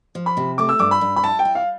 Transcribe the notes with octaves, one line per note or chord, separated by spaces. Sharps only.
F3
B5
C3
A3 D6
E6
G2 D6
B5
G2
B5
E4 A5
G5
E4
F5